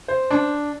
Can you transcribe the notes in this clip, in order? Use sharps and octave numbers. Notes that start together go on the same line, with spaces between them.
C5
D4